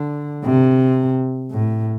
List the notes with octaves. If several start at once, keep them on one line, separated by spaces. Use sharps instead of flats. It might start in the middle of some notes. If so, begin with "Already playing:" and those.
Already playing: D3
C3
A2